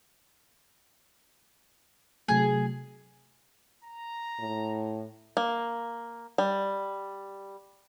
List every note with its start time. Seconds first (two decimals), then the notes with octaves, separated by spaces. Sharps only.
2.28 C3 F#3 A3 G#4
3.84 A#5
4.39 A2
5.37 A#3
6.38 G3